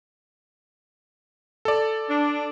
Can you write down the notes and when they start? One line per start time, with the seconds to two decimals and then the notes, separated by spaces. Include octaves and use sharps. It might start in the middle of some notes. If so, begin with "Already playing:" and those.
1.65 A4 D5
2.09 D4